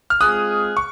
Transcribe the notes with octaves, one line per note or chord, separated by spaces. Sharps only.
F6
G#3 C4 F4 G#4 D#6 F#6
C#6